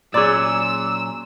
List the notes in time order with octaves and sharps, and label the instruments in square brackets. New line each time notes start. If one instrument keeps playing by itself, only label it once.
[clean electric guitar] A#2 F#3 C#4 [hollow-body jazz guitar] G#4 D5 [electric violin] E6